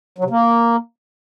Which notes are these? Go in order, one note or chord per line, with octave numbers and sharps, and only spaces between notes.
F#3
C3
A#3